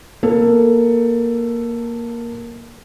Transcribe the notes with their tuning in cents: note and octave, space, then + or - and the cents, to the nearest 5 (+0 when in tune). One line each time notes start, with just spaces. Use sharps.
A#3 +10 A4 +10